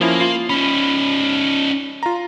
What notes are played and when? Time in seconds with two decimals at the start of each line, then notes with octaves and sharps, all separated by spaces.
0.01 F3 A#3 C#4 E4
0.20 F4 C7
0.50 C#4 D#4 B5
2.03 F4 A#5